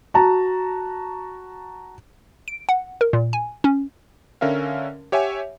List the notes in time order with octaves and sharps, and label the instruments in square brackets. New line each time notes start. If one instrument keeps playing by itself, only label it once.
[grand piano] F#4 A5 A#5
[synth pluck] D7
F#5
A#4
A#2
G#5
C#4
[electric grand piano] D3 C#4 A#4 E5 F5
G4 C#5 E5 F#5 G#5